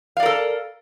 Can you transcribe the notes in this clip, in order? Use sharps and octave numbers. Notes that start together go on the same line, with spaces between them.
A4 A#4 D5 F5